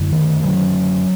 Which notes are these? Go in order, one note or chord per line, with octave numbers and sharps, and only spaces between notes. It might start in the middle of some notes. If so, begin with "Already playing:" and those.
Already playing: F#2 D3
D#3
F#3